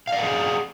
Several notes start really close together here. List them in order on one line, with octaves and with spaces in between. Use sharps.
F5 D5 F#5 G#4